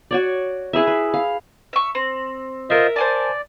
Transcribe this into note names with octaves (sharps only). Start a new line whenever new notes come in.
F#4 C#5 D5
E4 G#4 B4 E5
B4
F5
E5 C#6
C4
F4 A#4 C5 D#5 E5
C5 D5 G#5 A5